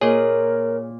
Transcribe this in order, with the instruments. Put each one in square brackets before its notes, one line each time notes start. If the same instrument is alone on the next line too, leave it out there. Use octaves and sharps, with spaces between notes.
[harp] A#2 [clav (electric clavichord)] G#4 D#5 [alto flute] A#4 [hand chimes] C#5